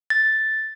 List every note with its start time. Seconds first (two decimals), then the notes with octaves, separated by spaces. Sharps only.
0.10 A6